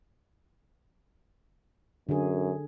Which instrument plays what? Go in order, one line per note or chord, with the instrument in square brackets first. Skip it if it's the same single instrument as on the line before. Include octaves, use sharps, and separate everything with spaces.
[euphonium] F#2 [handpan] D3 G#4